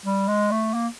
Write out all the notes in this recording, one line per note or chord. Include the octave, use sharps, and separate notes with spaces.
G3
G#3
A3
A#3